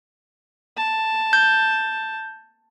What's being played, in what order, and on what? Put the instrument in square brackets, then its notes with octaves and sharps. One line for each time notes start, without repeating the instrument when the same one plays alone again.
[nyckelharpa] A5
[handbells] G6